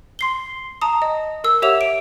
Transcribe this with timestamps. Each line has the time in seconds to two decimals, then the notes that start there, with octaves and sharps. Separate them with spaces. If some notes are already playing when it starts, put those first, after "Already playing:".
0.19 C6 C7 G7
0.81 A5 A#5 D#6
1.02 D#5
1.44 A#4 E6
1.62 G4 C#5 E5 F#5 E6 F7
1.81 D7